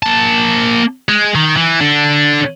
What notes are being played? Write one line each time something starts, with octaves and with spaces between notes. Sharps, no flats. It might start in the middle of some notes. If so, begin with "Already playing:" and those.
A#3 A5
G#3
D#3
E3
D3 D4